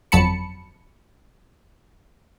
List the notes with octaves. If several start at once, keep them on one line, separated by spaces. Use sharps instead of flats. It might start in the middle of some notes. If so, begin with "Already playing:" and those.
G1 F2 F#3 A5 B5 C#7